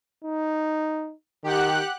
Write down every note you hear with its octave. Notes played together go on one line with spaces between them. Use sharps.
D#4
D#3 G4 F#5 F#6